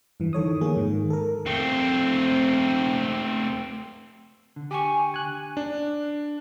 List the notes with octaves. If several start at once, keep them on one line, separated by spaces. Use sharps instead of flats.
G2 E3
D#3 A4 C#5 D#6
F3 A#3 G#4
G#2 D#3
A4 A#4
A3 C4
D3
G4 G#5 C#6
G#5 F#6
D4